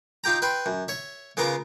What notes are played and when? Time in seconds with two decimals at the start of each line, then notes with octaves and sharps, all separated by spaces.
0.24 D#4 F4 G4 G5 A#5
0.42 B4 E5 G5 B5 C6
0.66 F#2
0.88 C#5 E5
1.37 C#3 B3 F4 A#4 A#5 D6